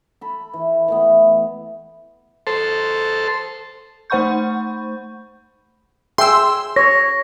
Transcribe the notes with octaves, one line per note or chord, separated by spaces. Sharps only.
A4 B5
E3
E3 A3 B3
A4 C5
A3 C5 F#5 B5 C#6 G6
G#4 E5 G5 C6 E6
C#5 A#6